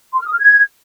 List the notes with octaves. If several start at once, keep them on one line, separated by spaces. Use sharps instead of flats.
C6
F6
D#6
F6
G#6